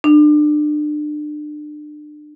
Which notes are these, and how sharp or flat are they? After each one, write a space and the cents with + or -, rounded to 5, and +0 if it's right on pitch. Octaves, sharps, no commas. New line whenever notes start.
D4 +30